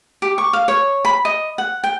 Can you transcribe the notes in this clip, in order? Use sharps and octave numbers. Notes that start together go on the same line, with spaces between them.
G4
C#6
F5
C#5
B5
D#5
F#5
G5